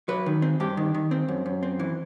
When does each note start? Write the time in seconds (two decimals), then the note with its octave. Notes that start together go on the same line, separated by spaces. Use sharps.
0.08 F#3 B4
0.26 D#3
0.42 C4
0.60 G2 G4
0.77 D#3
0.94 D#3
1.11 C4
1.28 F#2
1.46 F#2
1.63 C4
1.79 E3